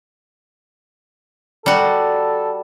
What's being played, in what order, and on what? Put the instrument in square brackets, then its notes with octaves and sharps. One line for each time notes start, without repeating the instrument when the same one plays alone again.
[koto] G3 F#4 [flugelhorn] A4